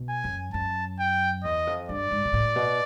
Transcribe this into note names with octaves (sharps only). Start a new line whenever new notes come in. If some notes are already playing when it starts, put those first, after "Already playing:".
Already playing: B2
G#5
F#2
F#2 A5
G5
E2 D#5
F2
G2 D5
G#2
A#2
A2
B2